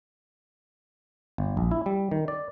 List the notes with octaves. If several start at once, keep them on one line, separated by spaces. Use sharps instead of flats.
G1
A#1
E4
G3
D#3
D5